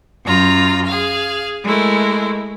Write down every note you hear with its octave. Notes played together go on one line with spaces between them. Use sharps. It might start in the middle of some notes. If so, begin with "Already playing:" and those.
F#2 F4 A#5
G#4 F5
G#3 A3 E4 A#4